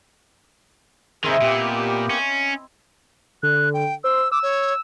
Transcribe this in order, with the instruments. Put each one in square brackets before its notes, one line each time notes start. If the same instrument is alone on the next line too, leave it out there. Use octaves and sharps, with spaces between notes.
[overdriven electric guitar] C3 D#3 [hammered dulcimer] C4 E4 D#5 [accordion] G#4 A#4 C5
[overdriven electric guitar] A#2 [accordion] A#3 B3 G4
[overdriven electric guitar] C#4
[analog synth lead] D3 [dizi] F#6
[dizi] G5
[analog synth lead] C5 [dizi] E6
[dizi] D6 [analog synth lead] E6
[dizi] C#5